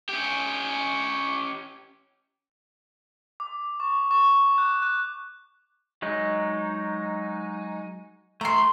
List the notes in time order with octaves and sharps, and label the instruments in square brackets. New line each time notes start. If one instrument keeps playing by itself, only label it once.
[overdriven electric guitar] C#4 G4
[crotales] D6
C#6
C#6
F#6
F#6
[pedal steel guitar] F#3 G#3 D#4
[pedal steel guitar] A3 [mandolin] A#5 C6